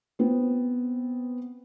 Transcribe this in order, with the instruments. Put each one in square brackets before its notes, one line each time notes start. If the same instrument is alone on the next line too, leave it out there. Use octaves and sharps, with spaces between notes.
[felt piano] B3 C4